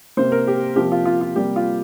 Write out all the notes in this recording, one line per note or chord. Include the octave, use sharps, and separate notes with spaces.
C3 A#3 C5
A#4
G4
C3 F3 A#3 G4
F4
F4
F4
C3 G3 A#3 G4
F4